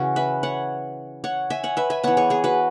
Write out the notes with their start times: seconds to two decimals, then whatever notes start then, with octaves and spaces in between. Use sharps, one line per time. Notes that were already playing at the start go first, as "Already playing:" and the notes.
Already playing: C#3 E3 C#4 F#4
0.16 B4 E5
0.43 C#5 F#5
1.24 C#5 F#5
1.50 E5 G#5
1.63 C#5 F#5
1.77 B4 E5
1.90 E5 G#5
2.03 E3 B3 C#5 F#5
2.17 G#4 C#5
2.30 G#4 C#5
2.44 F#4 B4